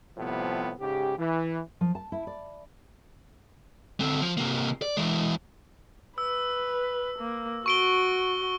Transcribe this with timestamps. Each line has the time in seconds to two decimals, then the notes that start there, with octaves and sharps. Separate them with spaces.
0.17 A2 C3 F3 G3 B3
0.80 G#2 C#3 G4
1.17 E3
1.81 F3
1.95 A5
2.12 E4
2.27 D5
4.00 D3 C4
4.21 F3
4.37 C3 A#3
4.82 D5
4.97 E3 G#3
6.18 B4 E6
7.19 A#3
7.66 F#4 C#6 D7 G7